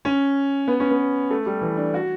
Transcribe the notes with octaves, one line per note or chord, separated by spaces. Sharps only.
C#4
B3
C#4
B3
A3
G3
E3
D4
F#4